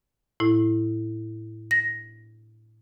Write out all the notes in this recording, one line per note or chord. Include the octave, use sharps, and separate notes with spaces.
A2 E4
A#6